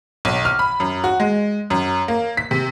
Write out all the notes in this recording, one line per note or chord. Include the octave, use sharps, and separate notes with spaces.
B1
F6
B5
F#2
F#4
G#3
F#2
A#3
B6
C3